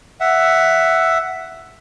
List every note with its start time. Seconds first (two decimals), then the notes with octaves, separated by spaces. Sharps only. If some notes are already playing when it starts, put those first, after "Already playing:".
0.20 E5 F#5